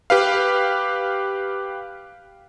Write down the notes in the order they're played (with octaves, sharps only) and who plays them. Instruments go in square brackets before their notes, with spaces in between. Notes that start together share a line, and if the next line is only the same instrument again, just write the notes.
[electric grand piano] G4 B4 F5